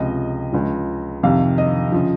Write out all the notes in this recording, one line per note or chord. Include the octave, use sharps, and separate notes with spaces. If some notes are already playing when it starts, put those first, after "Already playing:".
Already playing: C#2 C3 F3 D#5
C#2 C#3 F3
F2 C3 D#3 F5
D#5
C#3 F3